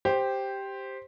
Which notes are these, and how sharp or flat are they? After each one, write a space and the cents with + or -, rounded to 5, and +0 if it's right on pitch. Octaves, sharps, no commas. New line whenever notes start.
G4 +0 C5 +0